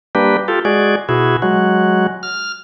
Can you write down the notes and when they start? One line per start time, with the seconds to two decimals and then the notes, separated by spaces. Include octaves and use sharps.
0.15 G3 A#3 D4 G4 B4
0.48 F4 G4 A4
0.65 G#3 F#4 G#4 D5
1.09 B2 E4 F#4 G#4
1.42 F#3 G#3 F#4
2.23 F6